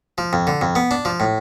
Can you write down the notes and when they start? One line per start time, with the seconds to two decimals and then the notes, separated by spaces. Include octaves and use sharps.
0.18 F3
0.33 F2
0.47 D3
0.61 F2
0.75 B3
0.91 D4
1.05 F3
1.20 A2